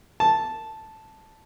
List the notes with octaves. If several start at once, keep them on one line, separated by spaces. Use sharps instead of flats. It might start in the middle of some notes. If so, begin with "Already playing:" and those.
A5